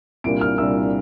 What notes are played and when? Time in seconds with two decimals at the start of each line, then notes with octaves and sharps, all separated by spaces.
0.24 C2 A#2 G3 A#3 D4 D7
0.41 F6
0.58 C2 A#2 G3 A#3 D4 E6